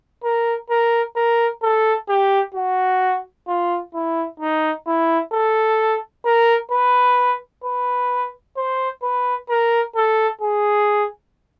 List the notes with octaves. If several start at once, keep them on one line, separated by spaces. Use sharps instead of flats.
A#4
A#4
A#4
A4
G4
F#4
F4
E4
D#4
E4
A4
A#4
B4
B4
C5
B4
A#4
A4
G#4